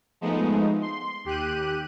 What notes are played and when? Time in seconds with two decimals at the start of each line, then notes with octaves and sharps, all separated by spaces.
0.21 F3 G#3 A3 B3 D#4
0.81 C6
1.24 D#2 G4 F#6 D#7